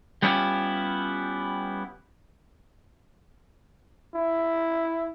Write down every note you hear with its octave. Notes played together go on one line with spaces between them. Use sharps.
G3 B3 C#4 E4 F4 G4
E4